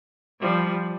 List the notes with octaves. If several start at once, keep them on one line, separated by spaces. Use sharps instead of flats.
F3 G3